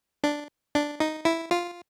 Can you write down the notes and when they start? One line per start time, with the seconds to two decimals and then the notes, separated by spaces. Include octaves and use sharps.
0.24 D4
0.75 D4
1.00 D#4
1.25 E4
1.51 F4